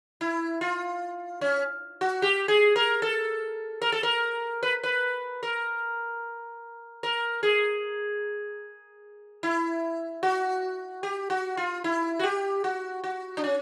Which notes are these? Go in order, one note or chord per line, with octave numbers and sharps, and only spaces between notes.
E4
F4
C#4
F#4
G4
G#4
A#4
A4
A#4
A4
A#4
B4
B4
A#4
A#4
G#4
E4
F#4
G4
F#4
F4
E4
F#4
G4
F#4
F#4
D4
C#4